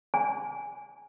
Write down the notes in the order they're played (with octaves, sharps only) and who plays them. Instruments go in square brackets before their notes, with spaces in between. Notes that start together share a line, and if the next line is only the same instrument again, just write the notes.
[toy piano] G#5